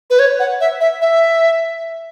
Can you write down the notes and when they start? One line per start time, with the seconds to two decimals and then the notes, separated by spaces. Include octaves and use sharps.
0.10 B4
0.19 C#5
0.39 F#5
0.61 E5
0.81 E5
1.02 E5